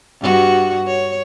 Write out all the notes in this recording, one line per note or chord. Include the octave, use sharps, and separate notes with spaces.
G2 F#4
C#5